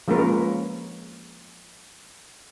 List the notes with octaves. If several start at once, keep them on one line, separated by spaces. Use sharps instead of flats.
F3 G#3 A#3 C#4 A#4 B4